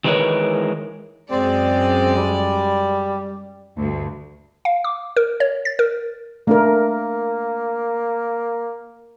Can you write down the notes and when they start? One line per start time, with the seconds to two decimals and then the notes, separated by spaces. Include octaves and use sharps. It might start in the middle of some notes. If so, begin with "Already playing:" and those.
0.04 D#3 E3 G#3 A#4 B4 C#5
1.31 F#2 G#3 C4 D5
2.17 G3
3.77 D2 G2
4.65 F5
4.84 D6
5.17 A#4
5.40 C#5
5.65 A6
5.79 A#4
6.47 A3 A#3 D4 A#4